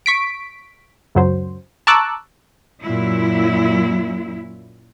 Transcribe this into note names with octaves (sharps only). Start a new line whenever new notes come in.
C#6 B6 D7
C#2 F#2 F#3 C5
A5 A#5 C#6 D6 E6 F#6
F#2 A#2 F#3 E4